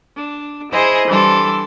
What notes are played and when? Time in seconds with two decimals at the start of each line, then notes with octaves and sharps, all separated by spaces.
0.16 D4
0.72 E4 G#4 C5 D#5
1.08 E3 G3 D4 A4 C6